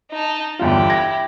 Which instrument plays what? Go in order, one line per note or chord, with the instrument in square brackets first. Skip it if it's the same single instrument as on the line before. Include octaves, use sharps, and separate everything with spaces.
[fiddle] D#4 A5
[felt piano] G1 E2 F4 [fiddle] E4 G4
[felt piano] G#6 A#6